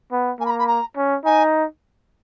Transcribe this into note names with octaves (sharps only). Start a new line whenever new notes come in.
B3
A#3 G#5
B5
A#5
B5
A#5
C#4
D#4 G#5